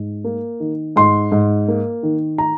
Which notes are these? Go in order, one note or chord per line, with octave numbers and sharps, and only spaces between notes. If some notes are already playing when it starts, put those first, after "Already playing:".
Already playing: G#2
A#3
D#3
G#2 C6
G#2
A#3
D#3
A#5